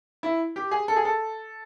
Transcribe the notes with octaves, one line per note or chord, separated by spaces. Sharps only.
E4
G4
G#4
A4
G#4
A4